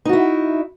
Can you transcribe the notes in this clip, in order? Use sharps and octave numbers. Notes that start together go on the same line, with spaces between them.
D#4 E4 F#4